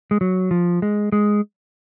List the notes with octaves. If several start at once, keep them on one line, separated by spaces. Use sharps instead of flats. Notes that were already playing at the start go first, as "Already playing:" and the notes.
G#3
F#3
F3
G#3
G#3